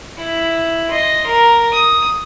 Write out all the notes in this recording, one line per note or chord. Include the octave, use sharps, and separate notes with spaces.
E4
D#5 C6
A#4
D#6